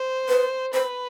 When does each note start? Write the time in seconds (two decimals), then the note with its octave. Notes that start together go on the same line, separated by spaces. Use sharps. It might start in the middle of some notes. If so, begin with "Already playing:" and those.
Already playing: C5
0.29 B4
0.73 B4 C5